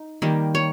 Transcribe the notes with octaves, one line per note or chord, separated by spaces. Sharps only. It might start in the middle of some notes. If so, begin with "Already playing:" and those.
Already playing: D#4
D#3 G3 A#3
C#5